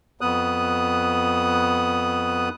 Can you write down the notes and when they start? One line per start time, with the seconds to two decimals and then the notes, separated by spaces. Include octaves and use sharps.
0.21 F2 B3 D#6 F#6